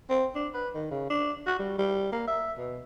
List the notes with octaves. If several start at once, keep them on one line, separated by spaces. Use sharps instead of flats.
C4
D4
B4
D#3
C#3
D4
F#4
G3
G3
A#3
E5
B2